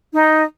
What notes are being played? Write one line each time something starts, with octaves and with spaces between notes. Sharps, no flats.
D#4